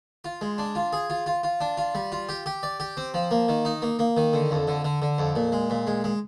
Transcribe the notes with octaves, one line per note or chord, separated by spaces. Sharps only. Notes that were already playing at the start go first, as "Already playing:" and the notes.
F4
G#3
D4
F4
G#4
F4
F4
F4
D4
F4
G3
F4
G4
G4
D5
G4
C4
F3
A#3
D#3
D#4
A#3
A#3
D#3
D3
F2
D3
D3
D3
F2
A#2
G#3
A#2
G#3
G#3